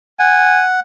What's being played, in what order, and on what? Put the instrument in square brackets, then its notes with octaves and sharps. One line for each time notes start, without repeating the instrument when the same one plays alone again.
[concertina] F#5 [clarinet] G#5